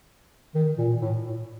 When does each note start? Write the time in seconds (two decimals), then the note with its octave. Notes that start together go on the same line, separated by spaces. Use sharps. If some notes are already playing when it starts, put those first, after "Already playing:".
0.55 D#3
0.78 A#2
1.01 A2